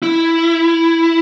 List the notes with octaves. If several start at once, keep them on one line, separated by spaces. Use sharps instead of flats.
E4